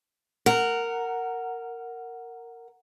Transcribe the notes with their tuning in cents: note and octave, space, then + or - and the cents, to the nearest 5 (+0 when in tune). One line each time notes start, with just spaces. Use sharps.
A#4 -10 F#5 +0